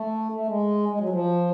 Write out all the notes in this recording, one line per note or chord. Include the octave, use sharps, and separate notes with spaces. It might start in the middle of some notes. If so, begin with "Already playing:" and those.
Already playing: A3
A3
G#3
G#3
F#3
F3